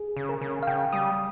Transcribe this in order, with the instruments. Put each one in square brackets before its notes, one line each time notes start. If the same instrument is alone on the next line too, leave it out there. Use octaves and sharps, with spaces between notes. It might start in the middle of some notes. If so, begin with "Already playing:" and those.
Already playing: [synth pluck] G#4
[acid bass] C#3
[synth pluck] A#4
[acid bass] C#3
[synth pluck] F5
[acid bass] C#3 [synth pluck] G5
[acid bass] G3 [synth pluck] D#6